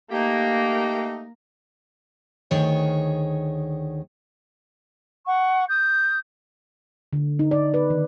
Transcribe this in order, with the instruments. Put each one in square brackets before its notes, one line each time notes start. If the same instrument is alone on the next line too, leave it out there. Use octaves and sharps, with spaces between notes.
[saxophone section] A3 D#4 G4 [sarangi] A#3
[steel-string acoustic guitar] D2 D#3 G#4 C#5
[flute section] F#5 C#6
D#6 G6
[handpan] D3
D#4
D5
B4
D#3